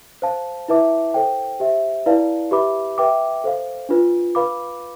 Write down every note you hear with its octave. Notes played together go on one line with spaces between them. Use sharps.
C5 F5 A5
E4 B4 E5 A5 D6
A4 C5 G5
G4 C5 E5
E4 B4 D5 F5 A5
G4 B4 E5 B5 D6
B4 E5 G5 D6
A4 C5 F5
D4 F4 B4
B4 F5 B5 D6